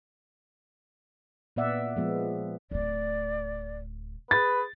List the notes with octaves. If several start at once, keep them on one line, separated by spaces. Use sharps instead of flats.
A#2 B3 D5 E5 F#5
F3 G#3 B3
D1 A3 D5
G#4 B4 A6